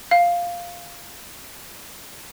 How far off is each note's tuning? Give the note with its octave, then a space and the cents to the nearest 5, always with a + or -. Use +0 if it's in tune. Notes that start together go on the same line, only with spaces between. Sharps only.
F5 +0